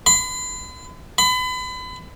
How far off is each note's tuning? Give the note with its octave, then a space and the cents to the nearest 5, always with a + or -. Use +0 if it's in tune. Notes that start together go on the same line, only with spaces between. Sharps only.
B5 +45
B5 +35